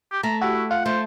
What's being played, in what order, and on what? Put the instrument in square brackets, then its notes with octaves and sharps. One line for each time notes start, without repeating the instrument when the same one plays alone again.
[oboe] G4
[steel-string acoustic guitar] A3 [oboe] A#5
[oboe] E4 [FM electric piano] F#4 G4
[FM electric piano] F4 [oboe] F#5
[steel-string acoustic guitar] A3 [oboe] C5